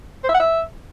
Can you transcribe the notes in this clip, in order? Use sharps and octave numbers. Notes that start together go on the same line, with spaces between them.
C5
E5
F#5
E5